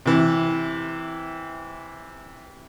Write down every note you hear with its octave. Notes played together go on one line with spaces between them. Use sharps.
C3 E3